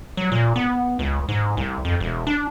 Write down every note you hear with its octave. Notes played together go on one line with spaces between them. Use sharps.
F#3
A#2
B3
C#2
G#2
C2
F2
E1
D4